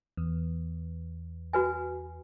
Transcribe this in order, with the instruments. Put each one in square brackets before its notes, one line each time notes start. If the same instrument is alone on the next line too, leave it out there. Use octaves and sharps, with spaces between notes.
[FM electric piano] E2
[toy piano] F#4 B4 G#5